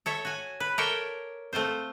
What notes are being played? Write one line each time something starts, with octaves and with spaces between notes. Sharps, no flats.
A4 C#5 E5
F#4 G#5
B4
A4 A#4 C#5 D5 E5 G5
A3 C4 F4 C5